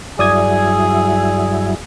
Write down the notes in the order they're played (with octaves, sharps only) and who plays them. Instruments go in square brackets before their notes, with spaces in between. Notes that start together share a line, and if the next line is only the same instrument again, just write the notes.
[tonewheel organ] G2 F#3 E4 [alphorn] G#4 [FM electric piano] D5 D#6 G#6